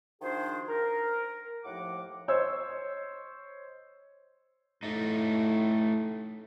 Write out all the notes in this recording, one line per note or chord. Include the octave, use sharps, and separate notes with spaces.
D#3 F3 D4 F#4 G#4 C5
A#4
D#2 A2 F3 F#5 D6
C5 C#5 D#5 E6 G#6
A2 A3 D#4